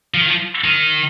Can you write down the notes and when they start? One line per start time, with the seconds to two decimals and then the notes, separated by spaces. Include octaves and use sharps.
0.14 F3
0.21 D#3
0.28 F3
0.64 D#3